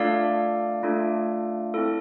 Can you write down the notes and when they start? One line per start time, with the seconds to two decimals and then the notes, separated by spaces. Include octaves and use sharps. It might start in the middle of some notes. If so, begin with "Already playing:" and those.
Already playing: A3 D4 F4 A4 D5 F5
0.83 A3 D4 F4 A4
1.74 C4 E4 A4